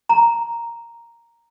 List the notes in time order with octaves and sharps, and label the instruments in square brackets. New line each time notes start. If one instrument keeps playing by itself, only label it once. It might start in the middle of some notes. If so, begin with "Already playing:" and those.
[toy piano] A#5